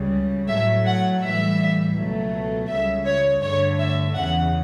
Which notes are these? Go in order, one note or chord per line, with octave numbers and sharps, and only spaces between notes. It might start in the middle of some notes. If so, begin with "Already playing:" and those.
Already playing: C#2 C#3 G3
A2 F#3 A3 E5
F#5
A2 E3 G3 E5
C#2 B2 F#3 A3
C#2 C#3 G3 E5
C#5
G2 D3 A3 C#5
E5
E2 C#3 E3 F#5